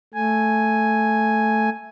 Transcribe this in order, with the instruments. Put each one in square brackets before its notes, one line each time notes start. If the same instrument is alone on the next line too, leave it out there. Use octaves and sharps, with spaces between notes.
[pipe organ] A3 G#5